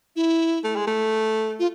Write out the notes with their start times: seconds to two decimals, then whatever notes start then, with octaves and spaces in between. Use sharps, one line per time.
0.16 E4
0.64 A3
0.75 G#3
0.87 A3
1.59 F4